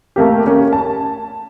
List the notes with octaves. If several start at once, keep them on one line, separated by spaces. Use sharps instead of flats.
A3 A#3 G4
A#3 C#4 G4
A5